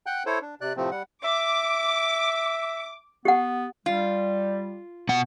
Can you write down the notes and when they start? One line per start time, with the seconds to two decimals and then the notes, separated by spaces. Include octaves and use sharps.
0.06 F#5 G5 F#6 G6
0.26 E4 A4 C5 C#5
0.42 D4
0.61 C3 D5 F#6
0.77 A2 C3 F3 A3 C4
0.91 G3 F#5
1.24 E5 D6
3.25 B3 G4 F#5
3.86 G3 F4
5.09 B2 F#5